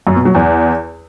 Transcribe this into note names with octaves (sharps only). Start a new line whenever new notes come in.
F#2
B2
F#3
E2